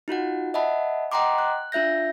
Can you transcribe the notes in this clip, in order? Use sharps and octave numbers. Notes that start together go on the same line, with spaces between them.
D#4 F4 F#4 F#5
D#5 E5 F#5 A5 B5
D#5 F#5 G5 A#5 C6 D6
F#6
D4 F4 E5 G6 A#6